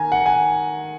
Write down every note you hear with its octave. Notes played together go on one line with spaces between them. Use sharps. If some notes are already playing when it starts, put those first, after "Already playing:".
Already playing: D#3 G#5 A#5
F#5
G#5